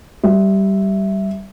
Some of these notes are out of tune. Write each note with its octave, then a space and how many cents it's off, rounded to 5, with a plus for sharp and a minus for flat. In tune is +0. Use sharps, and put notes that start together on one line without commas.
G3 -10 E5 +0